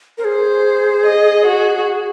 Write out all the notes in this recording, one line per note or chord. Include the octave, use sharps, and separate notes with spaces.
A#4
G#4 C5
D#5
F#4